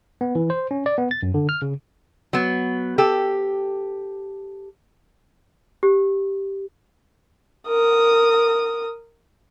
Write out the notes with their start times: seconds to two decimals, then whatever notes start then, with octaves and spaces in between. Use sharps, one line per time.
0.21 B3
0.35 E3
0.50 C5
0.71 C#4
0.86 D5
0.98 B3
1.11 A6
1.23 F#2
1.34 D3
1.49 F6
1.62 C#3
2.33 F#3 B3
2.98 G4 A4
5.83 G4
7.67 A#4 D#6